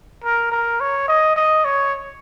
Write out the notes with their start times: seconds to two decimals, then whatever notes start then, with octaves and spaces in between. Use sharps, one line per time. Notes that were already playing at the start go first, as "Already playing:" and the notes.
0.24 A#4
0.52 A#4
0.81 C#5
1.09 D#5
1.36 D#5
1.65 C#5